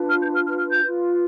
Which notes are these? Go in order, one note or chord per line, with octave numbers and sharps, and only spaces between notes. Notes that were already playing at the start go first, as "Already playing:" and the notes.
Already playing: D4 F4 B4
F6
G6
F6
F6
F6
G6
F4 B4